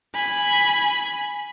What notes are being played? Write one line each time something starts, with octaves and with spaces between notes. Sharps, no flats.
G#5 B5